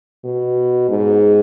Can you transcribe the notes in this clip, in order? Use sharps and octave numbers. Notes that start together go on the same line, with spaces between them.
B2
G#2